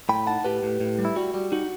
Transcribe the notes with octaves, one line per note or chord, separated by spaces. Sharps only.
A2 G5 B5
D#4 F#5 A5
A2 G4 B4
A2
A2
G3
E4
G3 F#4
G3
D#4 F#4